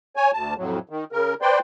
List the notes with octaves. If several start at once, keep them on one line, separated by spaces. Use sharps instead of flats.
C#5 G#5
D2 A5
F2 A2 F#3
D#3
C#3 A#4
B4 C5 D5 G5 C6